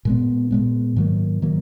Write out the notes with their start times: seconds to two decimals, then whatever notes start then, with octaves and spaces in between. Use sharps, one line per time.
0.05 A#2 G#3 B3
0.51 A#2 G#3 B3
0.96 G#2 D#3 F#3 A#3
1.42 D#3 F#3 A#3